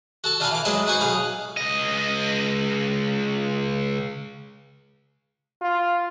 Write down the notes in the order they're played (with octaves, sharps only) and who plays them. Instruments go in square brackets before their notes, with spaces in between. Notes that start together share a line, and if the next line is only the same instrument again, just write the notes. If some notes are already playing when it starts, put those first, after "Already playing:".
[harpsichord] F#4 A4 A5
D3 F4 A4 F5 G#5 B5
E3 D6
F#3 G#3 B4 D5 E5 C6
G#2 F#4 G#4 B4 C5 C#6
B1 G#4 F5 B5
[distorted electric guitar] C#2 D#5
[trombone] F4